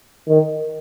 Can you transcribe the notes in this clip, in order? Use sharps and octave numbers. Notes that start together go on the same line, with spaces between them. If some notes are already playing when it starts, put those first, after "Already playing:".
D#3